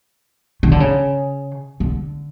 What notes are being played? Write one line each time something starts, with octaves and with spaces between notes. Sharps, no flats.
D#3
D3
C#3
D3